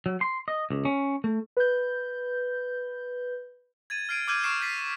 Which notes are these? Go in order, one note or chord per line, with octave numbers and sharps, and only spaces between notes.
F#3
C6
D#5
C#2
C#4
A3
B4 G6
G#6 A6 D#7
F6 G#6 C7 D7 D#7
D6 E6 F6 G6 G#6 D#7
C#6 D#6 F6 C7 D7 E7
G6 A6 B6 C7